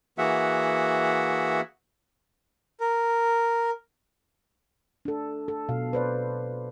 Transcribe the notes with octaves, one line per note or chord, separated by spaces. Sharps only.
E3 A#3 F#4 G#4 E5 F#5
A#4
D4 A4
A4
B2 F5
B4 C5 D5